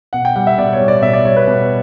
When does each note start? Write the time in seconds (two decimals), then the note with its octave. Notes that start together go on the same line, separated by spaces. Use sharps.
0.13 B2 F#5
0.25 G5
0.36 G3 F#5
0.47 E5
0.58 B2 D5
0.73 C#5
0.80 G3
0.88 D5
1.02 B2 E5
1.13 D5
1.25 G3 C#5
1.36 B4
1.47 B2